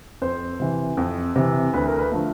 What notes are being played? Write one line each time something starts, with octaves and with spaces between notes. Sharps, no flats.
F2 C5
C3 E3
F2
C3 E3
D2 B4
A#4
B4
D3 F3 A3